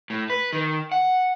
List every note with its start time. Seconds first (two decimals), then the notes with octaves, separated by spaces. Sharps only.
0.10 A2
0.30 B4
0.53 D#3
0.92 F#5